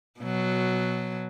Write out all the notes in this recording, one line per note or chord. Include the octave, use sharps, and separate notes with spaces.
B2 F#3